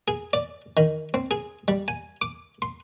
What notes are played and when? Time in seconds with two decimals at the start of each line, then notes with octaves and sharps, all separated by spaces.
0.08 G#4
0.33 D5
0.77 D#3
1.14 C4
1.31 G#4
1.68 G3
1.88 G#5
2.22 D6
2.62 C6